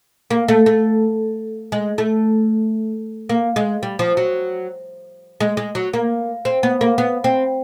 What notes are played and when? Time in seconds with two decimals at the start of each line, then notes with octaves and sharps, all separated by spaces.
0.31 A#3
0.48 A3
0.66 A3
1.72 G#3
1.98 A3
3.29 A#3
3.56 G#3
3.83 G3
3.99 F3
4.17 F#3
5.40 G#3
5.57 G#3
5.75 F#3
5.93 A#3
6.45 C4
6.63 B3
6.81 A#3
6.98 B3
7.24 C4